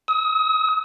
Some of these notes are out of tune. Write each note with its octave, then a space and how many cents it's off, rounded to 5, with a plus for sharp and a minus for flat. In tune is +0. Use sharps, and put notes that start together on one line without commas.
D#6 +40